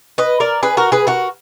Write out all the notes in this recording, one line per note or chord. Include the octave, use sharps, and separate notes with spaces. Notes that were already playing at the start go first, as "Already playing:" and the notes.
B4 D#5
A#4 D5
G#4 B4
F#4 A#4
G#4 B4
F#4 A#4